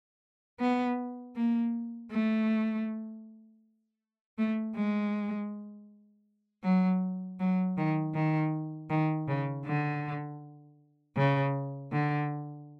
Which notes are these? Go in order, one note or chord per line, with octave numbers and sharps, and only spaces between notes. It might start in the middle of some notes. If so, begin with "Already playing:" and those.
B3
A#3
A3
A3
G#3
F#3
F#3
D#3
D#3
D#3
C#3
D3
C#3
D3